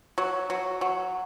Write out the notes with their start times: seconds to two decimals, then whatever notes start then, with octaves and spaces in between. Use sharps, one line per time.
0.18 F#3
0.50 F#3
0.81 F#3